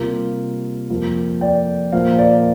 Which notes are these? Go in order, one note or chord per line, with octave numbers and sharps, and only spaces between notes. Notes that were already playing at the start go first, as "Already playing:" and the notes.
Already playing: C3 G3 A#3 F4 A#4
F2 F3 A#3
D5 G5
A#2 F3 A#3 C5 F5
A#4 D5